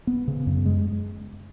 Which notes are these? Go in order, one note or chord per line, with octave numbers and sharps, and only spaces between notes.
B3
C#3
F#2
G#3